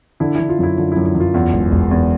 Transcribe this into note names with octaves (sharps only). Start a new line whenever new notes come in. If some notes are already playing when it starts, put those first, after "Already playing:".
D3 E4
D3 E4
F4
F#2 E4
D3 F4
E4
F#2
E4
F#2
F4
E2
E1
E1
E2